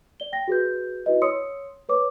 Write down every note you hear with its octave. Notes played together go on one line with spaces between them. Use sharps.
D5 G7
G5 A#6
F#4 G#4 B4 G6
E4 F#4 B4 D#5
C#5 C6 D#6 E6 C#7
B4 C#5 D6